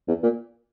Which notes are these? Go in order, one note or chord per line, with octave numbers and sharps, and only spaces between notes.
E2
A#2